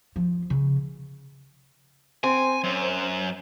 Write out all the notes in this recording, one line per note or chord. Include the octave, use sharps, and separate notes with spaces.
F3
C#3
C4 G#5
F#2